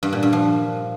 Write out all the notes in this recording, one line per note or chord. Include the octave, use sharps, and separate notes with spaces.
G2
A#2
G2
F3